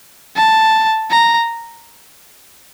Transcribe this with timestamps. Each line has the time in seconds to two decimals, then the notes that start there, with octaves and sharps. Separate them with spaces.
0.36 A5
1.10 A#5